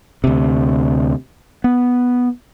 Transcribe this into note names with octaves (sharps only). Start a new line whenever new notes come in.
D2 C3
B3